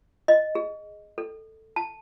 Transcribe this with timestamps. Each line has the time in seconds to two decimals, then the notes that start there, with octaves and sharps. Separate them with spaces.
0.28 D#5
0.55 G#4
1.18 A4
1.76 A5